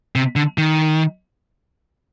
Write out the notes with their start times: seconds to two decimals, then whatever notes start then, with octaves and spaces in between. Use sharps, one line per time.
0.15 C3
0.36 D3
0.58 D#3